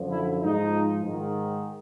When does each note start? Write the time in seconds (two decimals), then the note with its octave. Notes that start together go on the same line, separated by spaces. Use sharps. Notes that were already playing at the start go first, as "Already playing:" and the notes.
Already playing: F#2 D3 F3
0.11 E4
0.42 G#2 F3 D#4
1.05 G#2 D#3